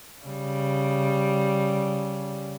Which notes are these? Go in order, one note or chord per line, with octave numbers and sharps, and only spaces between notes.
C#3 G3